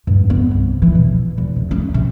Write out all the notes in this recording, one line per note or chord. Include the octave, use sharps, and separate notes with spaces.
G2
B3
C2
E3
B2
E2
C3
C#4
C3